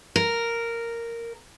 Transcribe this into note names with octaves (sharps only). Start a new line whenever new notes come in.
A#4